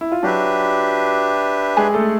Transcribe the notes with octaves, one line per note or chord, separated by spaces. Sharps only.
E4
F4
F#3 D4 F#4 G4 B4 E5
G#3 G#4
A3 A4